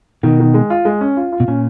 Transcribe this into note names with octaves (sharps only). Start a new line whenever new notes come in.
B2 D#3
D#3
G#3
F4
G#3
C#4
F4
F4
B2
A#2 C#4